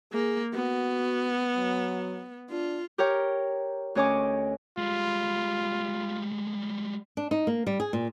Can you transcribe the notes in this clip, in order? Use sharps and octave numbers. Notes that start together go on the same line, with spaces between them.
A#3 G#4
B3 F#4
F#3
D4 F4
G4 A#4 C#5 G5
D2 C#4 C#5 D#5 G#5 D6
G3 G#3 F4
D4
D#4
A#3
G3
G#4
A#2